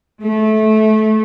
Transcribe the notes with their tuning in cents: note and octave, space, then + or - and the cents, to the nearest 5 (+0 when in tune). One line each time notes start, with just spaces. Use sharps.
A3 -20